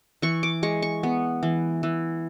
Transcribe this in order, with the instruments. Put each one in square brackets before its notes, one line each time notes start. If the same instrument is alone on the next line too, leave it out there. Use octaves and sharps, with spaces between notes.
[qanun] E3 C#6
D6
G#3 C#6
C#6
B3
E3
E3